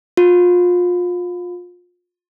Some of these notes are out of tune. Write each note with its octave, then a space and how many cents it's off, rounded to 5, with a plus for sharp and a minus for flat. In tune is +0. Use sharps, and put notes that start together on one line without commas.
F4 +30